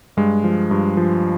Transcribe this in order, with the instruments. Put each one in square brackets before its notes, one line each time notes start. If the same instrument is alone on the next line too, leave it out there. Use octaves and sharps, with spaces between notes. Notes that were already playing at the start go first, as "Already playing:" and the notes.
[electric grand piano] G2 G#3
F3
G2
F3